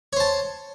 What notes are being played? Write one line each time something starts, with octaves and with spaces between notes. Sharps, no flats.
C5 C#5 A5